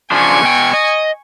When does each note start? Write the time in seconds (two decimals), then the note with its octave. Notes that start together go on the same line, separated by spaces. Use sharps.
0.11 C#3 F3 D4 G#5 C#6
0.42 B2 G5
0.74 D#5